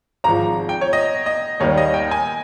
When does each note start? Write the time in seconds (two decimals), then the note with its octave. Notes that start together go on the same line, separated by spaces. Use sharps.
0.24 G#1 G#2 F3 A#5
0.69 G5
0.81 C#5
0.93 D#5
1.26 D#5
1.60 D#2 D#3 G3 C#5
1.77 D#5
1.94 G5
2.11 G#5